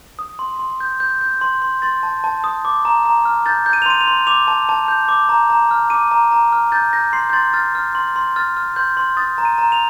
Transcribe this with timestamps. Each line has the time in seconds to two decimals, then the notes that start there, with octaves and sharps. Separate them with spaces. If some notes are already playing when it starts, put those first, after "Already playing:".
0.19 D#6
0.39 C6
0.59 C6
0.80 G6
1.00 G6
1.21 G6
1.41 C6
1.62 C6
1.82 C6 A6
2.03 A5
2.24 A5
2.44 D#6
2.65 D6
2.85 A#5
3.06 A#5
3.25 F6
3.46 G6 A6
3.66 G6
3.73 D#7
3.82 F7
3.86 C6 D#7
4.01 F7
4.07 C6
4.27 D6 F7
4.47 A5
4.69 A5
4.88 G6
5.08 D6
5.29 A#5
5.50 A#5
5.71 F6
5.90 D6 D#7
6.11 A#5
6.32 A#5
6.52 F6
6.72 G6 A6
6.93 G6 A#6
7.13 C6 C7
7.30 G6
7.33 C6 A6
7.53 F6 A6
7.75 F6
7.95 C6
8.16 C6
8.36 F6 A6
8.57 F6
8.76 C6 G6
8.97 C6
9.17 D#6 A6
9.38 A#5
9.45 D#7
9.58 A#5
9.72 F7